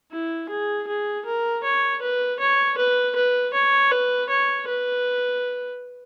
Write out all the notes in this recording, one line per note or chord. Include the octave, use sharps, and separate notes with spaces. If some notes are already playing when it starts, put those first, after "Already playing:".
E4
G#4
G#4
A#4
C#5
B4
C#5
B4
B4
C#5
B4
C#5
B4